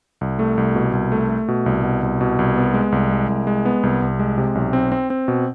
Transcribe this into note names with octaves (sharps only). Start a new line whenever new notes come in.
C2
A3
C2
B2
C2
A3
A3
B2
C2
B2
C2
B2
C2
B3
G#3
C2
G#3
C2
G#3
B3
C2
C2
G#3
C3
B1
C4
C4
C4
B2